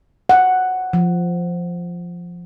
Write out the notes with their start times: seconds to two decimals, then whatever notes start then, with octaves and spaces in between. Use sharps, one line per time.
0.29 F#5
0.93 F3